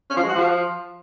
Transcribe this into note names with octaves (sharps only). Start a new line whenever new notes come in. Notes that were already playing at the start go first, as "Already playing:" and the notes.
C#4
F3
G#3
F#4
F3